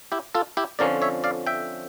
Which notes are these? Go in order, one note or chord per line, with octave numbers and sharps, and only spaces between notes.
E4 G4
F4 A4
E4 G4
F2 D3 F3 C#4 A#4 D5
C#5 E5
D5 F5
E5 G5